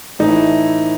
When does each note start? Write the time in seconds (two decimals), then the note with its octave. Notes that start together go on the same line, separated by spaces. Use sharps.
0.19 A2 E3 A3 D#4
0.28 E4